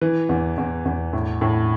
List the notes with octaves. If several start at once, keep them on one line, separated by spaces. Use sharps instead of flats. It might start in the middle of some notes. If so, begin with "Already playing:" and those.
E3
E2
E2
E2
A2
A2